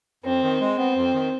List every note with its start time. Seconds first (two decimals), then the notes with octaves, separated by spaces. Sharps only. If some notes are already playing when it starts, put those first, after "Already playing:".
0.24 F2 C4
0.42 D#3
0.60 G#3
0.78 B3 C4
0.95 F2
1.13 D#3